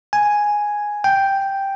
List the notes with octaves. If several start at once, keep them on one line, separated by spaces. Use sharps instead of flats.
G#5
G5